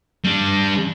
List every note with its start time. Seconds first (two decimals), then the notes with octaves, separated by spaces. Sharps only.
0.24 G3 D4